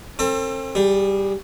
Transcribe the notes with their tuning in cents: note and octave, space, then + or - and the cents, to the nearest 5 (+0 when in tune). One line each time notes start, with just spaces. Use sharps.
C4 +35 A4 +35
G3 +0 G#4 -25